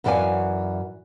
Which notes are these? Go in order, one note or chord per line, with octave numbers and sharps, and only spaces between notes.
F#2 E3 F#4 D5 F5 G#5